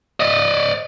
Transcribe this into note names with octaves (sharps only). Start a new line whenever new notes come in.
D5 D#5